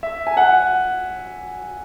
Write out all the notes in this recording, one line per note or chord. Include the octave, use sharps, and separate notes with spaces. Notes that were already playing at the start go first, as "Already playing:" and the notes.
E5
G#5
F#5